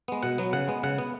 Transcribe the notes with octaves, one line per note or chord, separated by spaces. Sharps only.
G#3 B3
B2 F#5
F#3 B3
C#3 F#5
G#3 B3
C#3 F#5
B3